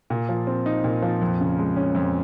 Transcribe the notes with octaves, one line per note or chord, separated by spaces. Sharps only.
A#2
F3
C4
D#4
A#2
F3
F2
C#3
G#3
C#4
F2